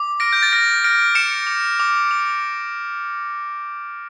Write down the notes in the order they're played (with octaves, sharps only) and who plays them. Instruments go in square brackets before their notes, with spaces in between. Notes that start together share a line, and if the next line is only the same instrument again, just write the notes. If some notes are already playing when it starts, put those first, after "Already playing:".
Already playing: [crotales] D6
F6 A#6 D7
G6
A6
F6 A#6
F6 A#6 D7
D6 C#7 E7
D6
D6
D6